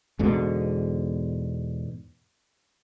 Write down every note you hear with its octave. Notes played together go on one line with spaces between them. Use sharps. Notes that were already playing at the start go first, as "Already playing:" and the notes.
E2 G#2 B2 D3